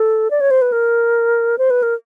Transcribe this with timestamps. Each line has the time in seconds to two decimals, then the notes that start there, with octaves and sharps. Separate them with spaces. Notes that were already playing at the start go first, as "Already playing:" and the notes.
Already playing: A4
0.31 D5
0.41 C#5
0.51 C5
0.62 B4
0.72 A#4
1.58 C5
1.70 B4
1.83 A#4